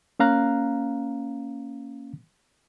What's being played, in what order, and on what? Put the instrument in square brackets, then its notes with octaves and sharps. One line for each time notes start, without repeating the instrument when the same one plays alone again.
[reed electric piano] A#3 C#4 F5 A#5 F#6